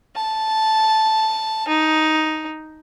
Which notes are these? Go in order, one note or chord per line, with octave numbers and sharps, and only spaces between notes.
A5
D#4